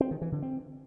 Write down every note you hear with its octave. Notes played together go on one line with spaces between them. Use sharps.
C4
D#3
E3
D3
C4